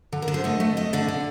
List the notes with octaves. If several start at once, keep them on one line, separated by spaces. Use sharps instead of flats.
D3
A#4
D3
C5
A3 D#5
A3
A3 D#5
D3 D5
D3